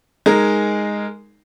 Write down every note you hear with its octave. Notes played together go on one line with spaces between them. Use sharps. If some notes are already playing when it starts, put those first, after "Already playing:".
G#3 D#4 G#4 A#4